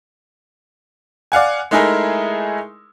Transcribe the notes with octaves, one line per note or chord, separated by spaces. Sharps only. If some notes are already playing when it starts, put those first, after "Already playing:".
D5 F5 F#5 G#5
G#3 A3 D#4 E4 G#4 A#4